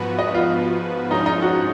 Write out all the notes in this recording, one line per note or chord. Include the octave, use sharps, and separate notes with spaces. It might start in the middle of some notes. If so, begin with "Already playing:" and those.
Already playing: G#2 F3 B3 F#4 B4
D#5
F4
G#2 F3 G#3 C#4 D#4 F4
D#4
F#4